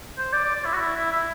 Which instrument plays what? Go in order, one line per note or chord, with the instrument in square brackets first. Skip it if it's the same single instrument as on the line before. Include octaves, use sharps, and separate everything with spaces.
[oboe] C5
D5
D5
D5
E4
F#4
E4
E4
E4